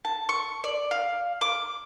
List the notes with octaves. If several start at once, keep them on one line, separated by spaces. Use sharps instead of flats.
A5
C#6
D5
F5
D6